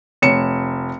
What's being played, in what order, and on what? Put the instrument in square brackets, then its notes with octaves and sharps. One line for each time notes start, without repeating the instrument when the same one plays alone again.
[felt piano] F1 C#5 C#7 E7